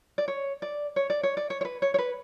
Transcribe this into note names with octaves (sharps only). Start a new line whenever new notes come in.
D5
C#5
D5
C#5
D5
C#5
D5
C#5
C#5
B4
C#5
C#5
B4